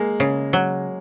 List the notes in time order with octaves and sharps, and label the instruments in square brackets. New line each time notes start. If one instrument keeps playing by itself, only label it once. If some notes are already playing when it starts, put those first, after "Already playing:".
Already playing: [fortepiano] G#3 A#3
[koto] C#3
F#3